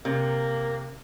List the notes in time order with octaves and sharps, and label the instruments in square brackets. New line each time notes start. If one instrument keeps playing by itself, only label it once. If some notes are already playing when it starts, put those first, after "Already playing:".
[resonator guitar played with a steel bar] C3 [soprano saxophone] A#3